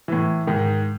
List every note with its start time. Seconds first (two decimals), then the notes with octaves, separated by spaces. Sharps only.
0.08 A2 E3
0.47 G#2 D#3